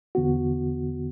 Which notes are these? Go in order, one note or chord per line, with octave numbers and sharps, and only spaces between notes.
E2 D3 B3 F#4